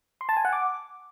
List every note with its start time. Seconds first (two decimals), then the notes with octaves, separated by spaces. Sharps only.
0.21 C6
0.29 A5
0.37 G#5
0.45 F#5
0.53 D6